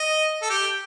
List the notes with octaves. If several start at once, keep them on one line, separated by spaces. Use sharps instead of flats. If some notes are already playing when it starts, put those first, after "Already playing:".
Already playing: D#5
A4
G4